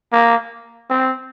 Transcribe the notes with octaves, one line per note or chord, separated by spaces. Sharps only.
A#3
C4